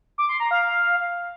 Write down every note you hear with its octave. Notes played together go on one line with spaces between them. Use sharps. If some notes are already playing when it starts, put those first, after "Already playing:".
D6
C6
A#5
F5